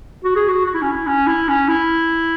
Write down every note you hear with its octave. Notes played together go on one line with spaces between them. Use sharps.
F#4
G#4
F#4
F#4
E4
C#4
E4
C#4
E4
C#4
E4